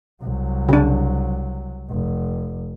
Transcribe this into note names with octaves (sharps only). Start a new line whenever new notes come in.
C2 F#3
C#3 D4
F1